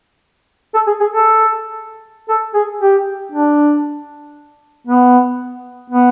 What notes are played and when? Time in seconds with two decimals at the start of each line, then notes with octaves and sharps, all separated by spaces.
0.74 A4
0.87 G#4
1.00 G#4
1.12 A4
2.29 A4
2.54 G#4
2.81 G4
3.32 D4
4.87 B3
5.90 B3